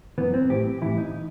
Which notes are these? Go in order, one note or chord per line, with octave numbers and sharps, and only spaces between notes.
F#2 E3 B3
C4
A2 E3 G4
A2 E3 E4
D#4